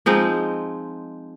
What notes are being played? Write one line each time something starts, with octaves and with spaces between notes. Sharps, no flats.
F3 G#3 C4 D#4